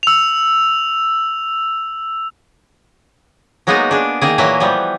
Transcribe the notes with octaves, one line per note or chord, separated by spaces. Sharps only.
E6 F7
F#3 G#3 A#3 B3 D#4 G#4
D4 G#4
D#3 A#3 G#4
A#2 E3 F#3 A#3 D#5 E5
E3 F3 G3 B3